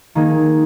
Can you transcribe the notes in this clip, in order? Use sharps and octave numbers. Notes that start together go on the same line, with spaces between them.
D#3 A#3 D#4 G#4